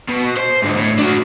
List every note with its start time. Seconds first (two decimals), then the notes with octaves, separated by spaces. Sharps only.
0.09 B2
0.37 C5
0.63 G#2 D3
0.77 A2
0.99 D4 F#4